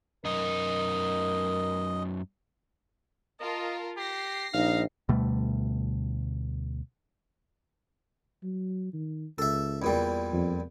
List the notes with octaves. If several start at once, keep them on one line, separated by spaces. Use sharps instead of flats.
F#2 D#4 A#4 D#5
F4 A#4 D#5 A5
G4 A#6 C7
A#1 D#4 F5
D2 B2 G3 A3
F#3
D#3
C#2 A4 E5
E2 A#2 G3
F2